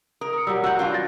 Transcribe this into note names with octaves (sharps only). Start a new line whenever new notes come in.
A#4 D#6
D#6 C#7
F#3 G3 E6
F#4 F#5 E6 G6
E3 D4 F4
A6 A#6